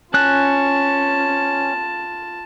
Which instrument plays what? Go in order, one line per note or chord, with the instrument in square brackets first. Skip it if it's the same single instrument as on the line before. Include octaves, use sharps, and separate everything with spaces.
[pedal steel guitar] C#4 F#6 [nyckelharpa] F4 A5